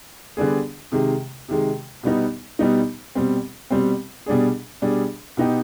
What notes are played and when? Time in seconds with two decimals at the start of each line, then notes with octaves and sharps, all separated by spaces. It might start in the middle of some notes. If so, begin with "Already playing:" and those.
0.37 D3 G3 B3 D4 G#4
0.92 C3 D#3 G#3
1.48 C3 D#3 G#3
2.03 B2 G3 B3 D#4
2.59 B2 G3 B3 D#4
3.15 B2 G3 C4
3.71 B2 G3 C4
4.26 B2 G3 D4 G#4
4.82 B2 G3 D4 G#4
5.37 B2 B3 D#4 G4